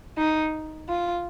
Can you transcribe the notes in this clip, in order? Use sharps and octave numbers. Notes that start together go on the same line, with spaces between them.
D#4
F4